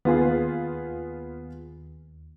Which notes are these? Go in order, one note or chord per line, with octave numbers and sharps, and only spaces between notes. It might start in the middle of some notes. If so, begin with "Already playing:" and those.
D#2 B3 F4 G#4